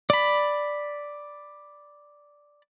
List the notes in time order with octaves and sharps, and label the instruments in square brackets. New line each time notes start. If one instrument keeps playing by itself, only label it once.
[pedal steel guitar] D5 B5